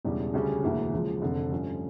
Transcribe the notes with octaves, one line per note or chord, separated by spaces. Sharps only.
E1 E2 C#3 G3 D4
D2 C#3 G3 C#4 G4
E1 D2 C#3 E3 A#3
C#2 C#3 F3
F1 F2 D3
G2 F3 A3 C#4